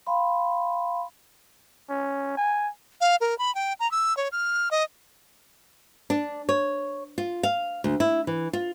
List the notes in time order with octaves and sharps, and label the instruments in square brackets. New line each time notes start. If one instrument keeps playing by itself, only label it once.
[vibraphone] F5 G5 B5 C6
[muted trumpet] C#4
G#5
[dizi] F5
A#4
B5
G5
A#5
E6
C#5
F6
D#5
[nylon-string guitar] D4
C#5
F4
F5
D2
E4
E3
F4